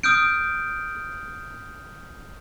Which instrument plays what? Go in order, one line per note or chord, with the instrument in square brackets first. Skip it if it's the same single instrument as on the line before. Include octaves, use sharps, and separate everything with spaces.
[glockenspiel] D#6 F6 G6 D7